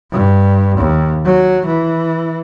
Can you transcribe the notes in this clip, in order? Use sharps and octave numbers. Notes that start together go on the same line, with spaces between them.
G2
D#2
F#3
E3